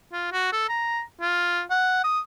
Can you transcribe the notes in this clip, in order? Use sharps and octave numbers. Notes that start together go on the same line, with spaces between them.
F4
F#4
A4
A#5
F4
F#5
D#6